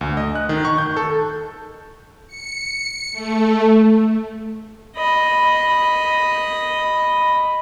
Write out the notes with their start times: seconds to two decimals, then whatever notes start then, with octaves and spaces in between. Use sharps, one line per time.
0.01 D2
0.17 D#5
0.35 F#6
0.49 D#3
0.65 C#6
0.78 G6
0.97 A4
2.27 C#7
3.12 A3
4.97 D#5 B5